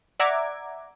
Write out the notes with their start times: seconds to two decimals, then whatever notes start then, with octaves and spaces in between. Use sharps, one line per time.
0.20 D5 E5 F#5 A#5 D6 G#6